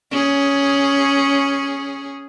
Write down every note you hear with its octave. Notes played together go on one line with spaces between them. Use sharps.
C#4 G#4